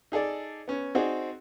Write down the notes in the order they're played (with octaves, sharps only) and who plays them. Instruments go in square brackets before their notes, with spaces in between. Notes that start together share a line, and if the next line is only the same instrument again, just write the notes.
[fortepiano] D#4 G#4 A4 D5
B3 C#4
C4 D#4 F#4 G#4 D5